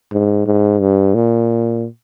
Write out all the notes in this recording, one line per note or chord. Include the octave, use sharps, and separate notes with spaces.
G#2
G#2
G2
A#2